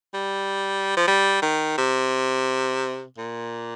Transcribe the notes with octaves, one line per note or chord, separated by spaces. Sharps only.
G3
F3
G3
D#3
C3
A#2